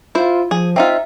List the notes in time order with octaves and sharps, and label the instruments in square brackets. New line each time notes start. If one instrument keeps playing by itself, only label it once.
[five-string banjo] E4 C5 [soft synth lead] F4
[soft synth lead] F3 [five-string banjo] G#4
[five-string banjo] C4 D#4 F4 [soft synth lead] E5